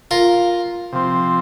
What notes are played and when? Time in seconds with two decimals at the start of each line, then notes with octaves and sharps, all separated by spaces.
0.11 F4 A#4
0.92 C3 F3 C4